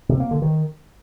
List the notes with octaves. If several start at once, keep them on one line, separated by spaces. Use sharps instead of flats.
C3
A#3
D3
D#3